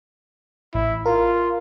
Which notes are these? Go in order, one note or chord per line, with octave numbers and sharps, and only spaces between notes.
A1 E4
F4 A#4